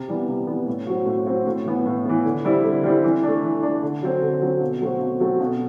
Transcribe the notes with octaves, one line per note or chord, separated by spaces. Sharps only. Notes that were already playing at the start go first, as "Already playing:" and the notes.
Already playing: C3
E3 G3 B3
C3
E3 G3 B3
A2
F#3 C4 F#4
A2
F#3 C4 F#4
A2
E3 B3
A2
E3 B3
D3
G3 C4 E4
D3
G3 C4 E4
E3
A3 D4
E3
A3 D4
D3
F#3 C4
D3
F#3 C4
B2
F#3 A3 C4 F#4
B2
F#3 A3 C4 F#4
B2